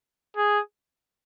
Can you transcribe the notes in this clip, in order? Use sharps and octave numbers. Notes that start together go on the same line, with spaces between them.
G#4